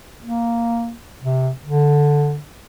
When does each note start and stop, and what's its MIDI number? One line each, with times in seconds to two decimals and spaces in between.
0.22 0.94 58
1.23 1.50 48
1.66 2.38 50